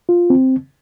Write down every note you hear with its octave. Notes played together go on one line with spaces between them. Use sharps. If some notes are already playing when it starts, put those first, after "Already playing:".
F4
C4